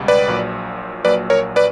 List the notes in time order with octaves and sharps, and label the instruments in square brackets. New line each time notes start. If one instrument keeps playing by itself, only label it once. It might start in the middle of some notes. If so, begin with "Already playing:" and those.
Already playing: [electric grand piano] C#2 B2 G3
B4 D5
A#1 A#2 F#3
A#1 A#2 F#3 B4 D5
A#4 C#5
B4 D5